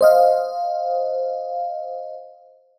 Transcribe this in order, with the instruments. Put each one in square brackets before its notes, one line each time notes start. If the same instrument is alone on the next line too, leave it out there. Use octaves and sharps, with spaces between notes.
[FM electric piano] C5 D#5 F5